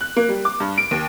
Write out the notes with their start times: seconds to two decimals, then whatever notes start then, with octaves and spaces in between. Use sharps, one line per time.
0.01 F#6
0.17 A#3
0.29 G3
0.45 D6
0.60 G2
0.78 D7
0.91 D#2